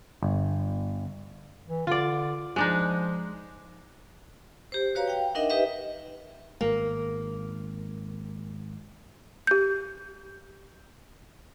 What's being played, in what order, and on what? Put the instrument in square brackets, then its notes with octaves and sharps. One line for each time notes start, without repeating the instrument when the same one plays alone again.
[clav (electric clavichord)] G1
[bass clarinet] E3
[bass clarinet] D3 [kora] F4 D5
[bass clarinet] F3 [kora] G#3 D4 D#4
[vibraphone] G4 C5
F#4 B4 C#5 F5 A#5
F5 G5
D4 D#4 A#4 D#5 E5 F#5
D#4 G4 B4 D#5 E5
[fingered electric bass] G#1 [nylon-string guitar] A#3
[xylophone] G4 G6